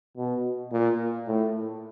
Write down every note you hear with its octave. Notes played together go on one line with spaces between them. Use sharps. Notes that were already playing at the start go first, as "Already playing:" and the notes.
B2
A#2
A2